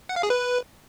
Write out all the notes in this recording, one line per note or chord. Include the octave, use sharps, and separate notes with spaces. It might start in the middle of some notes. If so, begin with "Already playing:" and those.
F#5
F5
G#4
B4